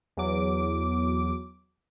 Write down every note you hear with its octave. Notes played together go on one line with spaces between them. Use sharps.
E2 F#3 D6